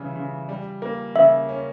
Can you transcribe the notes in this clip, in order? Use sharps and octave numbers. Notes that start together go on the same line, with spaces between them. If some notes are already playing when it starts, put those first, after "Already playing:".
Already playing: C#3 E3 G3
C#3
G3
A#3
C#3 E5
C#4